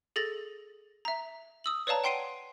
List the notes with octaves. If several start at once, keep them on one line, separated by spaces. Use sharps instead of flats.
G#4 A4 A6 A#6
E5 A#5
D#6 E6 F#7
B4 C#5 D5 F5 A5 A#5
F#5 G5 C6 C7 D7 D#7